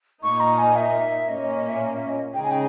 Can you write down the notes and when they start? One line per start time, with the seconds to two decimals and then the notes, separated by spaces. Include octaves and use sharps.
0.23 A#2 A#3 D#4 C#6
0.40 A#5
0.58 G#5
0.76 E5
1.29 A#2 A#3 C#4 D#5
1.42 D#5
1.55 D#5
1.69 E5
1.94 E5
2.08 D#5
2.34 C#3 G#3 D#4 G#4 G5
2.43 G#5
2.51 G5